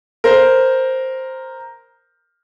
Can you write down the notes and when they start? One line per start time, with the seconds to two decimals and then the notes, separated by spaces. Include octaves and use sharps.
0.24 A#4 C5